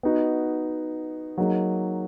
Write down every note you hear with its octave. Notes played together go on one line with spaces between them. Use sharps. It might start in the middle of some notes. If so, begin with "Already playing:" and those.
B3 D#4 F#4
F#3 A#3 D#4 G#4